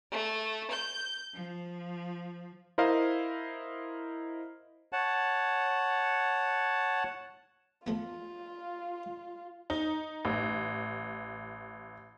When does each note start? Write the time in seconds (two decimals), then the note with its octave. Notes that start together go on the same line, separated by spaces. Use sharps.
0.12 A3
0.71 G6
1.34 F3
2.78 E4 A#4 C5 D#5 F5
4.93 C#5 F#5 A5
7.87 F3 A3 B3 F4
9.70 D#4
10.25 A1